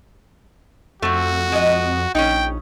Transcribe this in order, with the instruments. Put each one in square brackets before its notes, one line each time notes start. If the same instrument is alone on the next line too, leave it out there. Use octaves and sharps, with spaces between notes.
[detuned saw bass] F2 [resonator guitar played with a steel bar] A3 C4 [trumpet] F#4
[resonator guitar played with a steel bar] G#3 D#5
[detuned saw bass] A#1 [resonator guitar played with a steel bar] C#4 D#4 [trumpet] G5